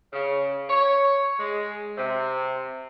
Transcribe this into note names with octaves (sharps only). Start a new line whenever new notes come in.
C#3
C#5
G#3
C3